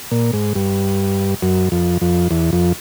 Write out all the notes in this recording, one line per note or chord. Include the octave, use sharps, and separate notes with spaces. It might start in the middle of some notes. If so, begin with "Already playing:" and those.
A#2
G#2
G2
F#2
F2
F2
E2
F2